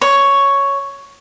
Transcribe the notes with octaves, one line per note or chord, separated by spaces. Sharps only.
C#5